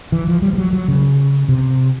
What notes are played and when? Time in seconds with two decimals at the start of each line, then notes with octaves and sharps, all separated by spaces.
0.12 E3
0.28 F3
0.42 G3
0.53 G3
0.58 F#3
0.73 F#3
0.88 C#3
1.49 C3